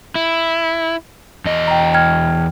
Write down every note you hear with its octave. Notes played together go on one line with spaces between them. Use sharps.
E4
E2 D#5
G5 A#5
G5 F6 G#6